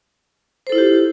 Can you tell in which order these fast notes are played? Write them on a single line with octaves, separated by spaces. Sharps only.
C5 A4 E4 F4 G4